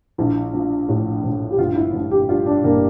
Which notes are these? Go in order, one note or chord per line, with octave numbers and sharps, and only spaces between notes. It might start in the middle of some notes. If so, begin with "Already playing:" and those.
A#1 E4
F3
A2
A#1
G4
G1 F4
E4
F3 F4
G4
G2 F4
D4
G1 A#3